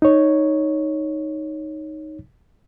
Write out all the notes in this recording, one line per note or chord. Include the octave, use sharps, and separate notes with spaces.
D#4 C#5